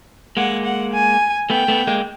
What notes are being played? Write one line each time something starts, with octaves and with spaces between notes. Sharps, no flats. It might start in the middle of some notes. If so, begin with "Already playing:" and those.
G#3 A#3 F#5
F#5
G#5
A3 B3 G5
A3 B3
G#3 A#3